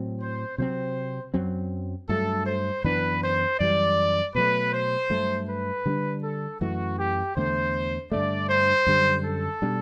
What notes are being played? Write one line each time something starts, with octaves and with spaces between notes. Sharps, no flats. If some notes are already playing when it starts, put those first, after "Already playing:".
Already playing: A2 F#3 C4
C5
C3 F#3 C4 C5
F#2 F#3 C4
G2 F#3 A3 A4
C5
F#2 E3 B3 D4 B4
C5
F#2 E3 G3 D5
B2 F#3 A3 B4
C5
G2 F#3 A3
B4
D3 G3 B3 D4
A4
F#2 E3 A3 F#4
G4
E2 D3 A3 C5
G2 D3 A3 D5
C5
F#2 D3 G3
A4
B2 G3 D4